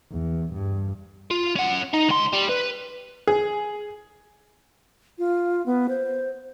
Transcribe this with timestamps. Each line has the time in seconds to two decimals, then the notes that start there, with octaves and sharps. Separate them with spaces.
0.11 E2
0.53 G2
1.31 F4
1.56 C#4 F#5
1.94 D#4
2.09 C#2 C6
2.33 G3
2.49 B4
3.27 G#4
5.19 F4
5.66 B3
5.89 C5